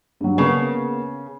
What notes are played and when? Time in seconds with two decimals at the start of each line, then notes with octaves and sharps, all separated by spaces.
0.21 G2 F#3
0.38 C#3 A#3 B3 G#4